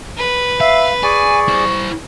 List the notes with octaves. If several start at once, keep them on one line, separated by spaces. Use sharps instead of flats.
B4
E5 F5
G#4 D5 G#5 C#6
E4 C5